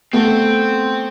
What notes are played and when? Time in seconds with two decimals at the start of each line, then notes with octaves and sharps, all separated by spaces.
0.13 A3 B3 C4